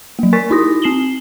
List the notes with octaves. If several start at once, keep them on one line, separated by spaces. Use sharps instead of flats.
F#3 A#3
A#4 G#5 C#6 A6 B6
D#4 E4 F#4 D#6 A#6
C4 C7 E7 F#7 G7